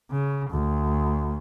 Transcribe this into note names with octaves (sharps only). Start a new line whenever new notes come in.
C#3
D2